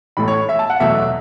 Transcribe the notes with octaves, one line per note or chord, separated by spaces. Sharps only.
A1 A2 A3 B5
C#5
E5
A5
F#5
E2 B2 F#3 A3 E5